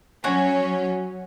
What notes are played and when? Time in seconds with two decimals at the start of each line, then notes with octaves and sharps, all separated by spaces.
0.24 F#3 C#4 F#4 C#5 G#5